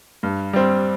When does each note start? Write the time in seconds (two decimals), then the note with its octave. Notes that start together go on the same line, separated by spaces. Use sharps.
0.23 G2
0.53 G3 C4